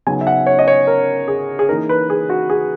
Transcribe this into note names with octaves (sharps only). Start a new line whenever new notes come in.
C#3 F#3 B3 D#4 G#5
E5
F#5
C#5
D#5
C#5
A#4
G#4
G#4
E3 A#3 D#4 A#4
B4
G#4
F#4
G#4